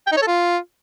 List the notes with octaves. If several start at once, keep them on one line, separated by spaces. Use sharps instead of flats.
G5
D#4
C#5
A4
F4